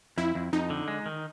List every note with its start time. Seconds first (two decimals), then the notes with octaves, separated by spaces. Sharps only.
0.18 F2 E4
0.35 F2
0.53 F2 D#4
0.70 D3
0.88 G#3
1.06 D#3